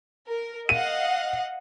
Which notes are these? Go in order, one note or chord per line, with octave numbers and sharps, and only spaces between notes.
A#4
D#5 F5 F#5 D#7